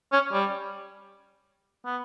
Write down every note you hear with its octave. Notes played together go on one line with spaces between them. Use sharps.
C#4
G3
B3